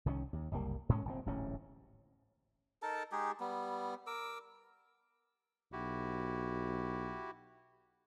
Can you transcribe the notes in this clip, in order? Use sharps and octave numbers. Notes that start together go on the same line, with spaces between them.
C2 D#3 A3 C#4
D#2
F#1 C2 G3 A#3
G#2 G#3 C#4
G1 A#2 C4
D1 A1 G#2 C#4
D#4 A4 A#4 A5
G#3 D#4 G4 G#4
G3 B3
A#4 D6 E6
B1 E4 F#4 G4